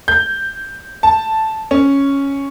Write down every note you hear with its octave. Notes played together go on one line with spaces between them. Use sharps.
G6
A5
C#4